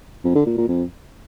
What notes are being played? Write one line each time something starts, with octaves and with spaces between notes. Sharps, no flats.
F2
D3
A#2
A#2
F2